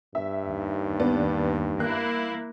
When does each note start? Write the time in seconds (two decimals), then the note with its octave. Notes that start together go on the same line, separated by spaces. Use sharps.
0.15 G2 E5
0.48 D#2
1.00 B3 D4
1.80 A#3 E4 F#6